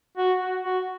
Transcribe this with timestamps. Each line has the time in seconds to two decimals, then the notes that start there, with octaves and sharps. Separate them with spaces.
0.18 F#4
0.41 F#4
0.63 F#4